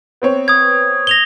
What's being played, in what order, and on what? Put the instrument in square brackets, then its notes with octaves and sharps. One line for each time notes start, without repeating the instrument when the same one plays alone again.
[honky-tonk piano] B3 C4 C#5
[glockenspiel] D#6 G#6
A#6 F7 G7